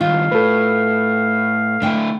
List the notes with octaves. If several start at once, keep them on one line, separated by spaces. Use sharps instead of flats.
G2 D#3 F4 F5
A2 A4 B4
D3 A3 E4 G5 G#5